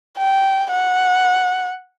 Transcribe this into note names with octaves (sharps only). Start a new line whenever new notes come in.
G5
F#5